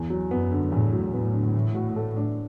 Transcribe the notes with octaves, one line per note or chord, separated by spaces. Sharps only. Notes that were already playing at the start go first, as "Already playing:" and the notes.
Already playing: E2
F#3
F#2 B3
D3
E2 A2
F#3
A2 B3
D3
E3
F#4
A4
D4